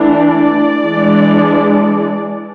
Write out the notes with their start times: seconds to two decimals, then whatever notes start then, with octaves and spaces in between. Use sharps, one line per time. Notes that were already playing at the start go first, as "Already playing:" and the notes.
Already playing: E3 A3 D4
0.10 D5
0.85 E3 G#3 D4